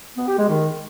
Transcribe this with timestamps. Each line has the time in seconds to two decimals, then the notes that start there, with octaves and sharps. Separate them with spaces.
0.17 B3
0.28 G4
0.38 G#3
0.49 D#3